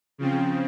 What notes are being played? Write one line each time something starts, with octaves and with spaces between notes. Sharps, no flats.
C#3 F3 C4